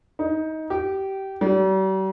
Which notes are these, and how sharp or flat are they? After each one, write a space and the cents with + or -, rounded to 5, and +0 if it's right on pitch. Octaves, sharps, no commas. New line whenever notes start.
D#4 +20
G4 -20
G3 -45